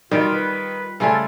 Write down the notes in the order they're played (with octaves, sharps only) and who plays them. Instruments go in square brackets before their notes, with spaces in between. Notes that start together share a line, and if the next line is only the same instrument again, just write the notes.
[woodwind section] B2 F4 [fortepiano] D#3 [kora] G3
[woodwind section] F4 B4
[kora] C#3 G3 F4 [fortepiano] A3 G#5 [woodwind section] A4